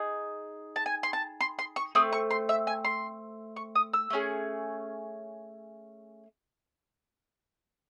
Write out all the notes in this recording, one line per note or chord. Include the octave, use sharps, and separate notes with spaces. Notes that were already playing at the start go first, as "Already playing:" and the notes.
Already playing: D#4 G#4
A5
G#5
C6
A5
C6
C6
C#6
A3 C4 D#6
C#6
C6
E5
G#5
C6
C#6
D#6
E6
A3 C#4 G#4